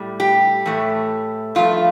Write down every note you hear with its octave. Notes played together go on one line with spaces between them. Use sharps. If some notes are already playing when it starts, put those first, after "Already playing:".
Already playing: A2 G3
G4
A2 E3 A3
G2 F3 A3 F4